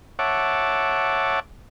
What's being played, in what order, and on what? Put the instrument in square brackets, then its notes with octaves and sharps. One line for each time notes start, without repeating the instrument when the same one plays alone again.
[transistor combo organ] C#5 E5 F#5 A5 D6